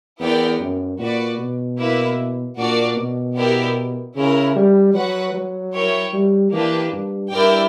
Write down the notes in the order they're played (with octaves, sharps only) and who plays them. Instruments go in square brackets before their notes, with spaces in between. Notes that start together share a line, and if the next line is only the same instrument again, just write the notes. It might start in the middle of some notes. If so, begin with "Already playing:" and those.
[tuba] E2 [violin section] B3 E4 A#4 D5 G5
[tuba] F#2
[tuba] A#2 [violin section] F#4 B4 D5
[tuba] B2
[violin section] A#3 E4 B4 E5
[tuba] A#2 [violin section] D4 F#4 A#4 D5
[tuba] B2
[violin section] B3 E4 G4 A#4 D5
[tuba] C#3 [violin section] C#4 E4 A#4
[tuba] G3
[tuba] F#3 [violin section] F#4 B4 F#5
[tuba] F#3
[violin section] E4 A#4 C#5 G5
[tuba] G3
[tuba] E3 [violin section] A#3 D4 G4 B4
[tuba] G2
[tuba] G2 [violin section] E4 A#4 D5 G5